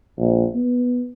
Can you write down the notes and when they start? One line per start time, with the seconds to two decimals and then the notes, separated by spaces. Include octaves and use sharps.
0.18 A#1
0.55 B3